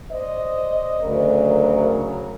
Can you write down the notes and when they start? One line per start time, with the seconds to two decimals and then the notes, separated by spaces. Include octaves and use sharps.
0.11 C5 D5 D#5
1.01 D2 C#3 F#3 A#4